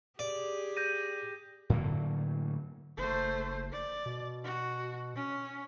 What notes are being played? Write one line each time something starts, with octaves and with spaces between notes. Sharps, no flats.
G4 G#4 D5
G6 A#6 D#7
A2 D3 F#3 A#3
F#1 A3 C5
D5
B2
F#4
C#4